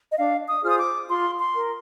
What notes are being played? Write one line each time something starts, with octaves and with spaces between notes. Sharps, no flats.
D#5
D4 F5
D#6
F4 G#4 C5 F6
D#6
D6
F4 C6
C6
A#4